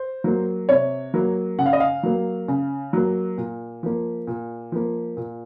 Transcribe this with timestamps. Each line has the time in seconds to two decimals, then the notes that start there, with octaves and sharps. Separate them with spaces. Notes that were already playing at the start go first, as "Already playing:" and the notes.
Already playing: C5
0.24 F#3 A#3
0.69 C3 C#5
1.14 F#3 A#3
1.59 C#3 F#5
1.66 F5
1.73 D#5
1.80 F5
2.03 F#3 A#3
2.48 C#3
2.93 F#3 A#3
3.38 A#2
3.83 F3 A#3
4.27 A#2
4.72 F3 A#3
5.17 A#2